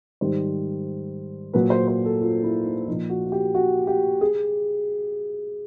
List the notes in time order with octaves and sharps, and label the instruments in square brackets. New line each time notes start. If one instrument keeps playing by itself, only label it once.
[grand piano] G#2 D#3 G3 C5
A#2 F#3 B4
C5
C5
A4
F4
E4
D#4
F3 D#4
A#2
F#4
F#4
G4
F#4
G4
G#4